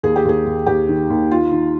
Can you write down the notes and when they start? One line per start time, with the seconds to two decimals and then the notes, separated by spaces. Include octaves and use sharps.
0.03 D#2 G#4
0.16 G4
0.25 D#2 G#4
0.46 D#2
0.66 D#2 G4
0.88 D#3
1.10 D#2
1.31 D#3 F4
1.52 D#3